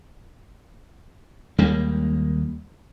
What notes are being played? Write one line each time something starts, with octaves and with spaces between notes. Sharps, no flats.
D#2 G3 G#3 A#3